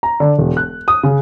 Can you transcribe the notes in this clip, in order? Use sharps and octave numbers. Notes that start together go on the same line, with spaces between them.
A#5
D3
E1
F#6
D#6
C#3